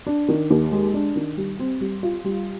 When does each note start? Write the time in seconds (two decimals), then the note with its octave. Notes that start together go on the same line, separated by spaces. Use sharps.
0.07 D4
0.28 D#3
0.50 D#2
0.72 G#3
0.94 D4
1.16 D#3
1.37 G3
1.59 C4
1.81 G3
2.03 F4
2.25 G3